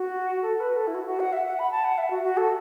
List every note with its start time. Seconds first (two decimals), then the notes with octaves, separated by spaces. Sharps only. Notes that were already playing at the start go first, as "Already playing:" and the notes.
Already playing: F#4
0.42 A4
0.60 B4
0.77 A4
0.87 E4
0.95 F#4
1.06 F#4
1.20 F#5
1.33 E5
1.46 F#5
1.59 B5
1.71 A5
1.84 F#5
1.98 E5
2.11 F#4
2.23 F#4
2.37 A4